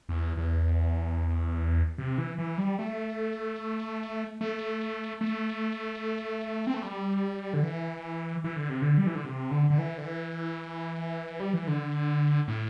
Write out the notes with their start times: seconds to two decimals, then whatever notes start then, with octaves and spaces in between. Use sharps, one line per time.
0.09 E2
0.37 E2
1.98 C3
2.18 E3
2.38 E3
2.58 G3
2.79 A3
4.41 A3
5.21 A3
6.67 C4
6.74 A3
6.82 G3
7.54 D3
7.63 E3
8.44 E3
8.56 D3
8.69 C3
8.82 D3
8.98 G3
9.07 E3
9.15 D3
9.24 C3
9.51 D3
9.70 D3
9.78 E3
9.98 D3
10.05 E3
11.40 G3
11.53 E3
11.68 D3
12.48 A2